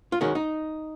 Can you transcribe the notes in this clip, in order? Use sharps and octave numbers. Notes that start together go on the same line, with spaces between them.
F4
D#3 G#3 C#4 F#4
D#4